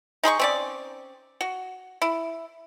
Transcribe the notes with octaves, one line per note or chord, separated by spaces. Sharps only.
D#4 G#4 B5 C#6
C4 C#4 D5
F#4
E4